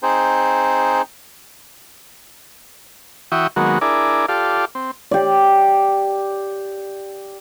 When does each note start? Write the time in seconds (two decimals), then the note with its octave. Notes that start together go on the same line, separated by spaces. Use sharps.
0.03 C4 D#4 G#4 C5
3.32 E3 F#4 E5 G5 C#6 D#6
3.56 D#3 F#3 G#3 A#3 B3 F#4
3.81 D4 E4 G#4 A#4 D5
4.29 F4 G4 A4 D5 F5
4.75 C4
5.11 G4 D5